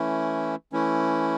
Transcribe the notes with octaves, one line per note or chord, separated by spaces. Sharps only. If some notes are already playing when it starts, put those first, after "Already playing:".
Already playing: E3 A3 C#4 E4
E3 A3 C#4 E4